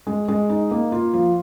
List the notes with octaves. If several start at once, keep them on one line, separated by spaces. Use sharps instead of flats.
G#3
G#3
D#4
A#3
F4
F3